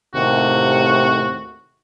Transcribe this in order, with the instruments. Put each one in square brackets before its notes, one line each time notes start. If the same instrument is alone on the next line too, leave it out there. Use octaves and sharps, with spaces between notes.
[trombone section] D#2 A2 C3 [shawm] F#4